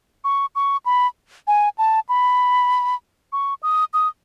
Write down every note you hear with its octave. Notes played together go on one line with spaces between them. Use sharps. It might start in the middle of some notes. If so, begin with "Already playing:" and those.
C#6
C#6
B5
G#5
A5
B5
C#6
D#6
D#6